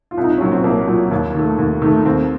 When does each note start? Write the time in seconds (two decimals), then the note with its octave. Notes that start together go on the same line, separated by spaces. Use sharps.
0.11 F4
0.17 C2
0.24 D#4
0.37 A#2 F#3 C#4
0.51 C4
0.64 C2 A#3
0.88 A#2 F#3
1.11 D#2
1.35 D#3 A3
1.58 D#2
1.82 D#3 A3
2.05 D#2 C4